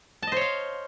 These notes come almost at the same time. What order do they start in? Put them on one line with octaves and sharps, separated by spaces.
A5 D#5 C5 C#5 F5